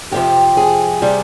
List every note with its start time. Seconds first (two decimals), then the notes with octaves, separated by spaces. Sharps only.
0.11 F2 C3 F3 G4
0.57 G#4
1.02 C3 G3